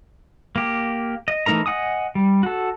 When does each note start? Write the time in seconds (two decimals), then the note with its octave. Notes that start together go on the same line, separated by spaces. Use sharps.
0.56 A#3 G4
1.28 D#5
1.46 E3 A3 D#4 A#4 A#5
1.66 D#5 F#5 G#5 D#6
2.15 G3
2.43 F#4 A4